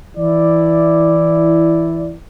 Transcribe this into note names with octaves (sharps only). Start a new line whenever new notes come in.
E3 E4 D5